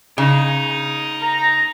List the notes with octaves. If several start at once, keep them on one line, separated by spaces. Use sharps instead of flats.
C#3 D#4
A#5